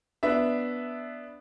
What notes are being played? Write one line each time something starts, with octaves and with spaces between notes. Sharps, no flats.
B3 D4 E5